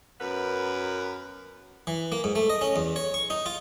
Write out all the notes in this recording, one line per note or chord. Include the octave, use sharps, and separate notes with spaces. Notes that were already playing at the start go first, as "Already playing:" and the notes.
F#2 B3 A#4 B4
E3
A#3
G#2
A3
D#5
C#4
E2
C#5
C#6
D#4
F4